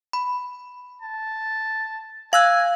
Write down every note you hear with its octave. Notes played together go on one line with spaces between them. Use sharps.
B5
A5
F5 G#5 E6 F#6